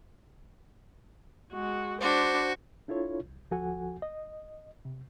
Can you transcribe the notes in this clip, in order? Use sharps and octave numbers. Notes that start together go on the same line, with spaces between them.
G#3 F#4
D4 F#4 C5
D4 E4 F4 A4 C#5
C2
D2 F3 F#4 A4 F#5 G#5
D#5
C3